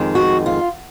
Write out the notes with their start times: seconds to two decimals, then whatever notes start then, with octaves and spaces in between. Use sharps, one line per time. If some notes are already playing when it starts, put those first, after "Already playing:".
Already playing: F2 D#3 G#3
0.15 F#4
0.46 F4